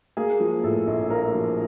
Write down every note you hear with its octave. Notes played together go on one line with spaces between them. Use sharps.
A#3 G#4
F3
A2 A4
A#1
A#3 A#4
F3